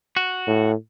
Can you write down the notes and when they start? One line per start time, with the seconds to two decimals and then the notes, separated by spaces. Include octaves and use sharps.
0.17 F#4
0.47 A2